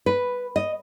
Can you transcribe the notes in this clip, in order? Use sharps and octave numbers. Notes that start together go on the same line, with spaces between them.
B4
D#5